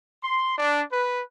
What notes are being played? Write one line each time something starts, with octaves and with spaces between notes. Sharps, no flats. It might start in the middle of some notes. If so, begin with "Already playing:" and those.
C6
D4
B4